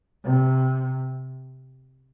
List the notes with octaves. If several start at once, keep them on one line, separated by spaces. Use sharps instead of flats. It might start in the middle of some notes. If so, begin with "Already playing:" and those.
C3